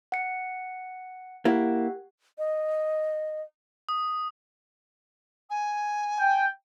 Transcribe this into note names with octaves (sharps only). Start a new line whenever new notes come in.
F#5 C#7
A#3 E4 G4 F#5
D#5
D#6
G#5
G5